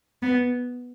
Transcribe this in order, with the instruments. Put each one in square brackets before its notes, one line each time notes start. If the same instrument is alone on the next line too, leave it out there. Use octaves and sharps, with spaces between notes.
[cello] B3